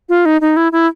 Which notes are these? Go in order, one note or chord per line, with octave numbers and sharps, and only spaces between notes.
F4
D#4
D#4
E4
E4